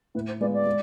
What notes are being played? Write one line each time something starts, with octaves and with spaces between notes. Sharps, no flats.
A2 B4
C5
G#3 B3 F4 D5
D5
G#3